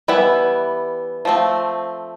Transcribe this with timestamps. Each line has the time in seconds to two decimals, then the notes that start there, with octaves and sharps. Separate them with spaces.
0.08 E3 G3 B3 E4 B4
1.25 F3 A3 C4